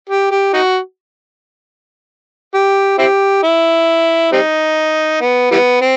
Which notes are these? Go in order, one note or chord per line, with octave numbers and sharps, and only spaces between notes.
G4
G4
D#4 F#4
G4
C4 E4 G4
E4
G3 C4 D#4
B3
E3 G3 B3
C4